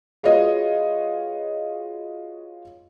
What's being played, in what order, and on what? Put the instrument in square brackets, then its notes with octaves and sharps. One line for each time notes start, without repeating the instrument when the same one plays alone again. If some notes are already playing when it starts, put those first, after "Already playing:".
[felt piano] G#3 F4 F#4 B4 C#5 D#5